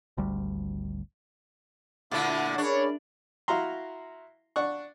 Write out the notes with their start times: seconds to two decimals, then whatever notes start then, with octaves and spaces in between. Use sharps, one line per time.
0.17 G#1 D2 G3
2.11 A#2 D3 A3 D4 E4 F#5 D6
2.58 C#4 D4 G#4 A#4 C#5 D5 B5
3.48 E4 F#4 F5 A#5 C6
4.56 D4 F#5 C#6